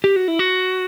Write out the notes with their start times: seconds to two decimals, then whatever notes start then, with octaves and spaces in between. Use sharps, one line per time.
0.04 G4
0.16 F#4
0.28 E4
0.39 F#4